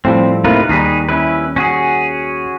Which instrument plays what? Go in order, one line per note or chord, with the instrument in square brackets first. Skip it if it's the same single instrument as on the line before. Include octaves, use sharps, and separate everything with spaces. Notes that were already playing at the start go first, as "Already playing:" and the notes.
[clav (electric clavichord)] A2 F3 G3 [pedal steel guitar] C4
[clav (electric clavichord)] A2 C3 A#3 [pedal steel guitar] D#4 F4 B4
[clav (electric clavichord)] D#2 G3 [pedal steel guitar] D#4 G#4 B4
[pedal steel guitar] C#4 E4 B4
C#4 F#4 G#4